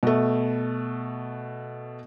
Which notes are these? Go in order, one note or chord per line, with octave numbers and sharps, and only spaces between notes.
B2 A3